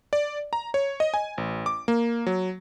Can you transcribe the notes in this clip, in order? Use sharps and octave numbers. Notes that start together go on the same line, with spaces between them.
D5
A#5
C#5
D#5
G#5
A1
D6
A#3
F#3